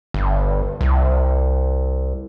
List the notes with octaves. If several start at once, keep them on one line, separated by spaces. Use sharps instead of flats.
G1
C2